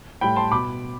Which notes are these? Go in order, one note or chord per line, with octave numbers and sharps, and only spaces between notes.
A2 G3 G5 B5
A5 C6
B2 B5 D6